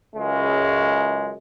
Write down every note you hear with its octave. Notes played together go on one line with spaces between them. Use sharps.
C#2 F#2 C#3 G#3